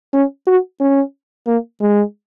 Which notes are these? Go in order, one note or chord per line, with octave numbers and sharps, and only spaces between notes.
C#4
F#4
C#4
A#3
G#3